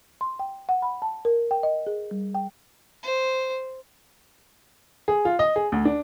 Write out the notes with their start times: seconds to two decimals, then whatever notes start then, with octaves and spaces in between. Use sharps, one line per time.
0.21 C6
0.39 G5
0.69 F#5
0.82 B5
1.02 A5
1.25 A#4
1.51 G5
1.63 D#5
1.87 G#4
2.11 G3
2.35 G5
3.03 C5
5.08 G#4
5.25 F4
5.39 D#5
5.56 G#4
5.72 D2
5.85 D4